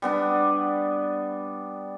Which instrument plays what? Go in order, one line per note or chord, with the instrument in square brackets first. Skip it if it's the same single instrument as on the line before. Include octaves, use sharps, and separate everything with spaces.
[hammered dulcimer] G3 B3 D4